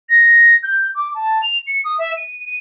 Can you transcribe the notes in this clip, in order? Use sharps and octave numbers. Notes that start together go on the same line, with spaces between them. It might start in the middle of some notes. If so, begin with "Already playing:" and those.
A#6
G6
D6
A5
F7
C#7
D#6
E5
D#7
D#7